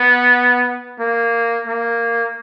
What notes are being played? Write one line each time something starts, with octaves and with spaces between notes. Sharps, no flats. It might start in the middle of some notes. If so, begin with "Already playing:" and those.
Already playing: B3
A#3
A#3